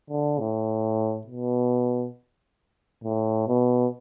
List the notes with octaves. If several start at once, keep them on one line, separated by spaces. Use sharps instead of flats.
D3
A2
B2
A2
B2